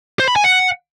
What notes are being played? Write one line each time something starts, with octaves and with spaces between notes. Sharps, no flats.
C5
B5
G#5
F#5